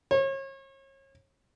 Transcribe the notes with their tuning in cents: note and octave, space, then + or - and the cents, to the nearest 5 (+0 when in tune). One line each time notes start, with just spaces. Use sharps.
C#5 -35